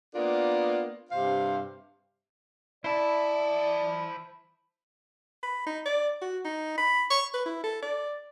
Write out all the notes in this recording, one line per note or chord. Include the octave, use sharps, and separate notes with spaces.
A#3 B3 D4 F4 A#4
G2 C3 C5 F5
E4 C5 D5 A5
B5
D#4
D5
F#4
D#4
B5
C#6
B4
E4
A4
D5